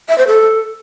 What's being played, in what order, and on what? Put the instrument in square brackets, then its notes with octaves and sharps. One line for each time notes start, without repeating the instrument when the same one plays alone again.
[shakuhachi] E5
C5
A4